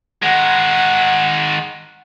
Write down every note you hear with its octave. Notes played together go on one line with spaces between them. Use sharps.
D#3 G#3 F#5